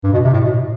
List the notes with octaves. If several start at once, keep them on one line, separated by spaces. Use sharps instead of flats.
G2
B2
C3
A2
B2